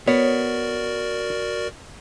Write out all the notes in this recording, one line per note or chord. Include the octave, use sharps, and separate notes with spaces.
B3 F#4 A#4 C#5 D5